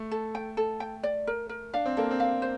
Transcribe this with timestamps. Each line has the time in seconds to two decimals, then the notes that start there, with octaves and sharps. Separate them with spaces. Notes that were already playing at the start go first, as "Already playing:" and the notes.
Already playing: A3
0.11 A4
0.35 G5
0.57 A4
0.80 G5
1.03 D5
1.27 A#4
1.49 A#4
1.74 D4 F5
1.86 C4
1.97 A#3 A4
2.11 C4
2.20 F5
2.42 C5